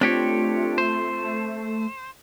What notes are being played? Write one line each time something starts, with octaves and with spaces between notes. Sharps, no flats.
A3 C4 D4 F4 G4 C#5
C5